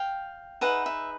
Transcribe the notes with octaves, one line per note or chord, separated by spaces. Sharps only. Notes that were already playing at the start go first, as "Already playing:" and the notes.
Already playing: F5 G5
D#4 G#4 B4 E5 F#5
E5